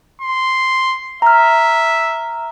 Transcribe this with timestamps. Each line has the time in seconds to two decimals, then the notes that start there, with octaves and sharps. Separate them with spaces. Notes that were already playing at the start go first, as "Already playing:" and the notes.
0.21 C6
1.22 E5 A#5 F6